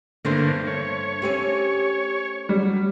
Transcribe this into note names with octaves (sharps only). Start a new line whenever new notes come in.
G2 D3 A3 A#3 C5
C#5
A3 C4 C#4 G4
F#3 G3